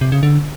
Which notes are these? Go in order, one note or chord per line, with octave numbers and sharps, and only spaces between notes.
C3
C#3
D3